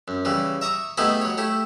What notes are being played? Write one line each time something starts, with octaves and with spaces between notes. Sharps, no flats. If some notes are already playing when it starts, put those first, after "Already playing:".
F#2
C#3 E3 G3
E5 A#5 C#6 D#6
A3 B3 D#4 E4 G4 G#4
F#3 C#5
A3 E4 G4